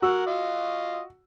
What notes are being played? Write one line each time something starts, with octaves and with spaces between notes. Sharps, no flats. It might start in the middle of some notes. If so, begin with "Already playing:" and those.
F#4 A#4 F#5 E6
F4 D#5